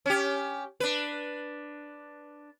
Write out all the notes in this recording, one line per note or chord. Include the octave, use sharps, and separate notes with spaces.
C#4 G4
D4 B4